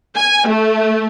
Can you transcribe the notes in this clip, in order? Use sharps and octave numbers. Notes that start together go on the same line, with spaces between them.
G#5
A3